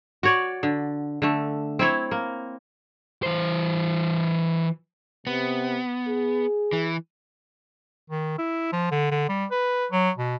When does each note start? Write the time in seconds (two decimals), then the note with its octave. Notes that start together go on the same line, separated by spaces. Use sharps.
0.23 F#4 C#5 D5
0.63 D3
1.22 D3 A3
1.79 C4 E4 C#5
2.11 A#3
3.23 E3 C5
5.27 C3 B3
6.09 G#4
6.73 E3
8.10 D#3
8.38 E4
8.73 F3
8.91 D3
9.11 D3
9.29 G3
9.51 B4
9.92 F#3
10.18 B2